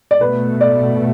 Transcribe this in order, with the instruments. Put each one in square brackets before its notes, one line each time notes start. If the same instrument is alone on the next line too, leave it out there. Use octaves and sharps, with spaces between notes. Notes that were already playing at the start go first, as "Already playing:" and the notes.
[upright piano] D5
[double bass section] B2 A3 [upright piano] B4
[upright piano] D5